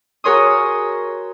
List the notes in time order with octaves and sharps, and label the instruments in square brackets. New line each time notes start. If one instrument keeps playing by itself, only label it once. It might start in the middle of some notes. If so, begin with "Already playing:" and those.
[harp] F#4 G#4 A#4 C#5 C6 D#6